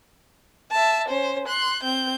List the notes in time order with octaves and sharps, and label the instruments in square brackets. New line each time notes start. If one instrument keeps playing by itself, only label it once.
[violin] E5 A5
C#4 C5
C6 F#6
C4 G6